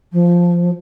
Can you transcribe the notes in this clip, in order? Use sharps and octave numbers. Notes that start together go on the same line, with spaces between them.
F3